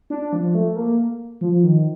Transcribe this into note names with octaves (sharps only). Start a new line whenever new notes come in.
D4
F3
A3
A#3
F3
D#3